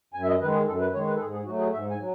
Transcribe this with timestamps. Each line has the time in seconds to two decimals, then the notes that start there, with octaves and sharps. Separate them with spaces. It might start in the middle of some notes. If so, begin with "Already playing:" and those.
0.14 F#2 G#5
0.23 E5
0.28 D#5
0.41 D#3 B4
0.44 G#3
0.53 G#4
0.67 F#2 A4
0.80 B4
0.93 D#3 G#3 C#5
1.07 B4
1.15 A4
1.20 G#2 G#4
1.33 G#4
1.46 F#3 A3 F#4
1.59 G#4
1.73 G#2 E5
1.90 G#5
1.99 F#3